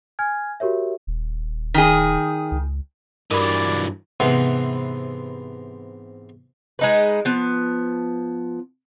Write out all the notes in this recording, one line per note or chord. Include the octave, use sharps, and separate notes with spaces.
G#5 F6 G#6
F#4 G4 A#4 C#5 E5
D#1
D#3 G#4
C#2
G2 E3 F#3 A#4 D5 B5
G#2 C3 E3 G#3 B3 E4
G#3 D#4 B4
F3 B3